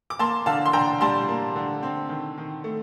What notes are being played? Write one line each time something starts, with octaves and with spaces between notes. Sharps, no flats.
D6
A#3 A5 C6
D3 F5 A5
C6
D3 G5 A#5
G3 A5 C6
A#3
D3
C4
D#3
D#3
A3